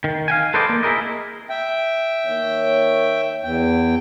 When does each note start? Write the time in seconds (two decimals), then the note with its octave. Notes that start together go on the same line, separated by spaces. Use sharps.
0.04 D#3
0.28 F5 G5 G#5
0.54 A4 B4 C5 D5 D#5
0.69 A#3
0.83 E4 G#4 A#4 D#5
1.50 E5 G5
2.26 D#3 A#3 C#5
3.44 E2 G5